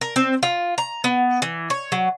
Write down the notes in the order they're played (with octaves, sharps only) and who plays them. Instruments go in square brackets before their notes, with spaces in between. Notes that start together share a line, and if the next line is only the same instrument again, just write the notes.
[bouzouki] A#4
C4
F4
A#5
B3
E3
C#5
F#3